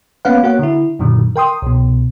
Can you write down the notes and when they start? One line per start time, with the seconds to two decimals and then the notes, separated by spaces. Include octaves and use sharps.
0.25 A#3 B3 C#4 B4 F5 F#5
0.43 A#3 F#4 C#5 F#5
0.59 D3 E4
0.99 F#2 A#2 D3 D#3 F#3
1.36 A#4 G5 C6 D#6
1.62 C2 B2